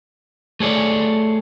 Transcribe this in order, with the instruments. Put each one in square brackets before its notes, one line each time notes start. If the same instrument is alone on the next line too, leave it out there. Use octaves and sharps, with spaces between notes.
[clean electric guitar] A3 G#4 C#5 D5